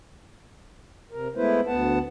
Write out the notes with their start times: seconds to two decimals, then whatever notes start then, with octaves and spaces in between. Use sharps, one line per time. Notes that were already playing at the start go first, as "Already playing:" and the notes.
1.11 C3 A#4
1.36 G#3 A3 B3 E4 B4 C5
1.67 D2 B3 F#5 A5